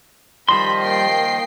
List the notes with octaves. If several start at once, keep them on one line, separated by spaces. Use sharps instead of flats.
D#3 F3 G3 C5 D#5 B5 C6
A#3 G5 C7